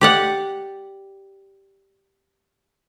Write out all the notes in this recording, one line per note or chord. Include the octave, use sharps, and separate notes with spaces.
G4 D5 F#5